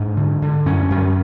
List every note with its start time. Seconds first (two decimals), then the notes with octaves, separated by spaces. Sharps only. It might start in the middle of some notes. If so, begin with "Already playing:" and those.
Already playing: G#2 D4
0.17 D3
0.42 D3
0.66 F#2 C#4
0.90 F#2